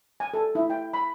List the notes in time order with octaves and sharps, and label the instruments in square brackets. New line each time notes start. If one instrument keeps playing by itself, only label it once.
[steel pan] G#5
A4
E4
G5
B5